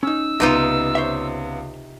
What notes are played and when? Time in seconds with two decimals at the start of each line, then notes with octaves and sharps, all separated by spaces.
0.03 C#4 D#4 E6
0.40 C#2 C3 B3 D#4 F4 D#5
0.95 C5 C#5 E5